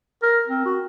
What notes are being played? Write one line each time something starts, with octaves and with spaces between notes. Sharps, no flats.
A#4
C4
F#4